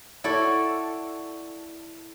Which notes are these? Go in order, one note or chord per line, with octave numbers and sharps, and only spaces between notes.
E4 F#4 A4 D5